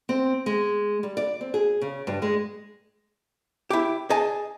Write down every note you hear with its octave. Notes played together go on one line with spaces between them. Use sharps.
C4
G#3
G3
D5
C4
G#4
C#3
G2
G#3
E4 G4
G#4 D#5 G#5 A5